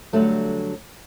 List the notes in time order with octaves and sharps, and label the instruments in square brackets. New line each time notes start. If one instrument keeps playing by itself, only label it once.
[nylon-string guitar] D3 F#3 G3 A3 D4